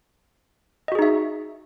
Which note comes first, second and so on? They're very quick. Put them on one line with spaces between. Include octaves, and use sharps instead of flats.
D#5 F#4 G#4 D#4 E5